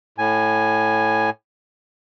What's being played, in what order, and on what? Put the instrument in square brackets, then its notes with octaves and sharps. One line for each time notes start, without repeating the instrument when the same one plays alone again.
[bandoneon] A2 G#5